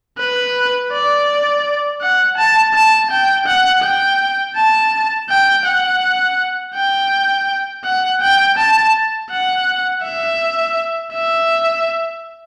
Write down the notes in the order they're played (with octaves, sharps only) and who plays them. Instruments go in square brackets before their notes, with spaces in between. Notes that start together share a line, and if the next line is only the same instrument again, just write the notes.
[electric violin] B4
D5
F#5
A5
A5
G5
F#5
G5
A5
G5
F#5
G5
F#5
G5
A5
F#5
E5
E5